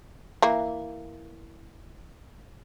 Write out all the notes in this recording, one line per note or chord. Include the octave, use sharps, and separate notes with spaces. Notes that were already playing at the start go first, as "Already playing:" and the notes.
E3 A#3